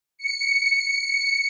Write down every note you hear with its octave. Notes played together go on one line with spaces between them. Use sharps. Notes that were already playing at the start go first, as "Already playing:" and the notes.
C#7